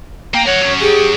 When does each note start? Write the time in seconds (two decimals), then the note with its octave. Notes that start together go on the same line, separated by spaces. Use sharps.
0.34 A#3 G5
0.46 A#4 C#5 F#5
0.61 F#3 C#4
0.81 G4 G#4